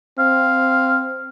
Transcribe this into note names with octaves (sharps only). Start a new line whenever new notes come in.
C4 F5